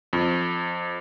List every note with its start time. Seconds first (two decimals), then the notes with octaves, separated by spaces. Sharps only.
0.13 F2